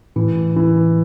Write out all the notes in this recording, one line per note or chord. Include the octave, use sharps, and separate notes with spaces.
A2 E3
E3